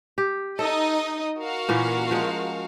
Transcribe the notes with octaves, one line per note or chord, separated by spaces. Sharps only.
G4
D#4 A4 D#5
F#4 A#4 F5
A#2 E3 C#4
F3 G#3